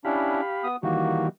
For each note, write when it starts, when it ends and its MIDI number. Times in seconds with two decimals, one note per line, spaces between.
0.05 0.41 61
0.05 0.41 62
0.05 0.41 64
0.05 0.68 67
0.05 0.68 77
0.05 0.68 83
0.64 0.76 59
0.64 0.76 87
0.83 1.29 51
0.83 1.29 52
0.83 1.29 55
0.83 1.27 58
0.83 1.27 66